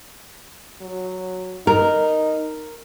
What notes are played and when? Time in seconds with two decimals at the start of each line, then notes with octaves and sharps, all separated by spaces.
0.82 F#3
1.67 D#4 A#4